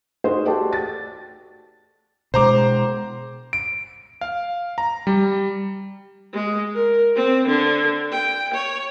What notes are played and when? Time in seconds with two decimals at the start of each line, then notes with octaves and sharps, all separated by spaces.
0.24 D#4 F#4 G#4 C5
0.45 F#4 G4 A4 D5 G5 A5
0.73 A6
2.34 B2 G#3 C5 A#5 D6
3.53 D7
4.21 F5
4.78 A#5
5.07 G3
6.33 G#3
6.74 A#4
7.16 C4
7.48 D3
8.12 G5
8.54 C#5